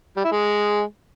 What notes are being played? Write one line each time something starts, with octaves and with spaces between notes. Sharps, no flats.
G3
E4
G#3